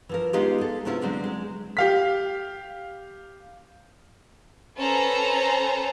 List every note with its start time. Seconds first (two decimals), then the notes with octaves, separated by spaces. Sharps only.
0.09 E3 F3 A#4
0.33 G#3 B3 D#4 F4 G4 G#4
0.58 G#4 A4
0.85 C3 B3 C#4 E4 F4
1.01 D3 F#3 G#3 C4 D4
1.24 G#3
1.77 G4 F5 B6
4.78 C#4 A4 B4 C5 A5 A#5